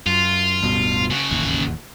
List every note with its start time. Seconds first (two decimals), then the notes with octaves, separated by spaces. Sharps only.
0.06 F#2 F4
0.62 D1 G2 B2
1.11 C#3 F#4
1.30 E1 A1 D#2